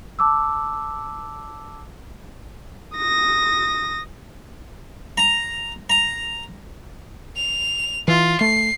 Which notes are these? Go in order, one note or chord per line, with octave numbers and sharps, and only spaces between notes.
A5 D6 E6
D#6 A#6
A#5
A#5
F7
E3 F4
A3 C7